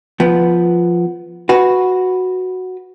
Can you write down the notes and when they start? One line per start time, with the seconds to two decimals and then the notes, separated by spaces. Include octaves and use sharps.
0.20 F3 B3
1.49 F#4 B4